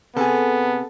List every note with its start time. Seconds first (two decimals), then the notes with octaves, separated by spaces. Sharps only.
0.17 C3 B3 G#4 A4